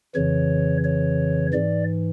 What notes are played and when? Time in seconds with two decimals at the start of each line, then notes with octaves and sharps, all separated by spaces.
0.15 F2 C#3 E3 C#5
0.84 C#5
1.53 G#2 E3 D5